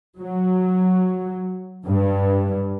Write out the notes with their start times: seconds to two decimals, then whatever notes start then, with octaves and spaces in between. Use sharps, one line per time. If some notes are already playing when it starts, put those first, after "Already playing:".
0.20 F#3
1.87 G2